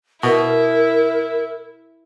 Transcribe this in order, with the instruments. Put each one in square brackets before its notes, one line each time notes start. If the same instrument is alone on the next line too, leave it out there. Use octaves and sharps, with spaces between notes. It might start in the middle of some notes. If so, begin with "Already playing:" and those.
[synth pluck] B2 [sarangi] E4 [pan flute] A#4